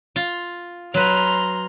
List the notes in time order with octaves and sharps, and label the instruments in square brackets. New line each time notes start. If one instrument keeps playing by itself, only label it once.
[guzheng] F4
[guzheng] F#3 B4 [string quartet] A#5 C6 F6